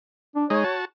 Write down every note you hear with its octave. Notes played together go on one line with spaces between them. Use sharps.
D4
G#3 D#4 C#5
F#4 A5